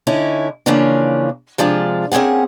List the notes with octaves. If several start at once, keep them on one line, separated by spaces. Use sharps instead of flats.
D3 C#4 D#4 E4
C#3 E3 F3 A#3 C#4 D4
C3 F3 G#3 D4 F4
A#3 C4 C#4 G#4 F#5